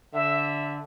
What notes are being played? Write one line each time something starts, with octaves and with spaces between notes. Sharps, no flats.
D3 E5